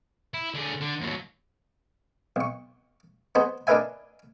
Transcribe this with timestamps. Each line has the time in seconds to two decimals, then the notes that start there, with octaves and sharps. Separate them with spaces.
0.34 E4
0.54 D3 G#4
0.81 D3
1.01 D#2 F#3
2.36 B1 C#6
3.35 B3 D#4 G#4 C5
3.67 D4 D#4 A#4 B4 E5 G#5